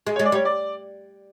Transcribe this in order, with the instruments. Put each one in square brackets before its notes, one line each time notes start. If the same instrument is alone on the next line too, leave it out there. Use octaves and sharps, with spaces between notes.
[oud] G#3
[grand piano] C#5
[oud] G#3
[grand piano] D5
[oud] G3 [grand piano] C#5
[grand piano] D5